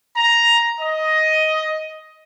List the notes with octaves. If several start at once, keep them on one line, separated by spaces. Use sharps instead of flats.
A#5
D#5